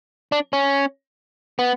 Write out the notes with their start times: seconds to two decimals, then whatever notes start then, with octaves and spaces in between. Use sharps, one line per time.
0.32 D4
0.53 C#4
1.59 B3